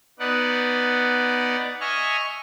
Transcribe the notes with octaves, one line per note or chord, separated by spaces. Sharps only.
B3 D#4 D5 F#5
D#5 E5 G#5 C#6 F6